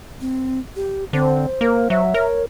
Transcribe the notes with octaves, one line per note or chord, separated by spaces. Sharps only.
C4
G4
D3 C4 C5
A#3 A#4
F#3 E5
A#4 C#5